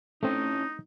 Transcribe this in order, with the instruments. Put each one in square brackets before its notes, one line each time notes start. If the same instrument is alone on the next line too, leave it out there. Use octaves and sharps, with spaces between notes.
[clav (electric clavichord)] A3 C4 [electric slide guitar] C#4 E4 [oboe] D#4